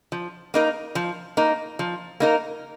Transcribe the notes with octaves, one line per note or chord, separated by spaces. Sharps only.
F3
A#3 D#4 A#4
F3
A#3 D#4 A#4
F3
A#3 D#4 A#4